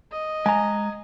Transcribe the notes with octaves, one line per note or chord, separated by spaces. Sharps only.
D#5
G#3 G#5 A#5